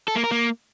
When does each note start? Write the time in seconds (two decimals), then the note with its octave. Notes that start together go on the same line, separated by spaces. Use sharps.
0.08 A4
0.16 A#3
0.24 A#4
0.32 A#3